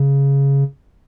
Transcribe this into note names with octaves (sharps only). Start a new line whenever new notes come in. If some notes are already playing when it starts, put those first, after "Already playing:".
Already playing: C#3